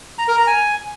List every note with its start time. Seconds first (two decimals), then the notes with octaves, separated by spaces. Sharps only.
0.18 A#5
0.28 A#4
0.37 A#5
0.47 G#5